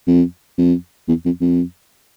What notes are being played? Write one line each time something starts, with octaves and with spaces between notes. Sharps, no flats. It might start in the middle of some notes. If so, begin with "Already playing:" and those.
F2
F2
E2
F2
F2